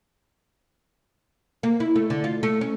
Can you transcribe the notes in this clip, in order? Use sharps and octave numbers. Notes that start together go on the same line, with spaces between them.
A#3
E4
A3
D3
F4
A3
C#4